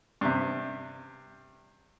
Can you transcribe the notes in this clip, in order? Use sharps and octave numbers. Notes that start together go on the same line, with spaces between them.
G2 C3